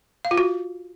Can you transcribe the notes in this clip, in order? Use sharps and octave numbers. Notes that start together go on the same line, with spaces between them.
F5
F4
F#4